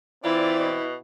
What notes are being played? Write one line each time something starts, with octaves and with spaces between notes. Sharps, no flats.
E3 C4 E4 F4 D5
B2